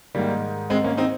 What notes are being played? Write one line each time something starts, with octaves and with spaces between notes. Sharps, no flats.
G#2 D#3 G3 A#3
G#3 C4
A#3 C#4
C4 D#4